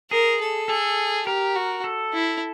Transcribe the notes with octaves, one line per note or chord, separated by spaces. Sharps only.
G#4 A#4
A4
G#4 A4
G4 A#4
F#4
A4
E4